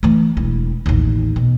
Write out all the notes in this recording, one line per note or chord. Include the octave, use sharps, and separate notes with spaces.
E3 A3
E1 E4
A1 D#2
B2